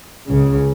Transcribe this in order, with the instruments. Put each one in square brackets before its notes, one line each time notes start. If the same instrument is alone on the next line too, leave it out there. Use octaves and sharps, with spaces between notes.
[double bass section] C#2 C#3